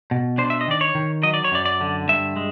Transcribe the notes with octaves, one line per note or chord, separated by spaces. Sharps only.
B2
D4 C5
E5
D#5
D#3 D5
C#5
D#3
F#3 D#5
D5
C#5
F#2 D5
D5
D3
G2 E5
G#3